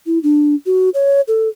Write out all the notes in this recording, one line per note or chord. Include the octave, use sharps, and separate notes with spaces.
E4
D4
F#4
C#5
A4